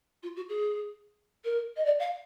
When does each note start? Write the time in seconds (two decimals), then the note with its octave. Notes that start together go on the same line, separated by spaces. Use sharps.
0.23 F4
0.36 F#4
0.49 G#4
1.44 A#4
1.76 D#5
1.85 D5
1.99 F5